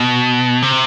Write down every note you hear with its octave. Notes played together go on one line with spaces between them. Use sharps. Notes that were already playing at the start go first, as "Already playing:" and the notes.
Already playing: B2
C3